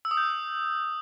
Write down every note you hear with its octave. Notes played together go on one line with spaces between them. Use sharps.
E6
D#6
G6
E6